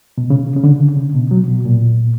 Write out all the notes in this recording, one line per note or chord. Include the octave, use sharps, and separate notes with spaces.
B2
C#3
C#3
D3
C#3
B2
F#3
B2
A#2